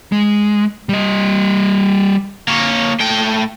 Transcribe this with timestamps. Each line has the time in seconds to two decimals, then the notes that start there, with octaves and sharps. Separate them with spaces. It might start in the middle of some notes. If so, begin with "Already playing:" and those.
0.12 G#3
0.89 G3 D#5
2.48 A#3 C#5
3.00 A2 G5